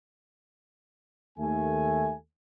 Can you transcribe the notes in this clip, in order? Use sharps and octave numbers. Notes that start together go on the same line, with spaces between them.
D#2 A3 G#5